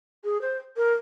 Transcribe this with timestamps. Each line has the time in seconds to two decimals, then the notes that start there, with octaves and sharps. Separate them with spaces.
0.24 G#4
0.41 C5
0.77 A#4